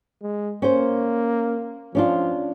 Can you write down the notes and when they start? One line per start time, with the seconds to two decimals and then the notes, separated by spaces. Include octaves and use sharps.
0.22 G#3
0.62 A#3 C#4 C5
1.95 F3 C#4 D4 F4